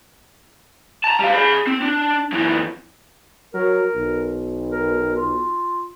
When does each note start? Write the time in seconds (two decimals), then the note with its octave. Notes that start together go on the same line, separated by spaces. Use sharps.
1.04 A5 A#5
1.19 G3 F5
1.34 G#4 B5
1.67 C4
1.82 D4
2.32 F#2 E3
3.54 F#3 A#4
3.94 B1
4.71 A#4
5.16 F4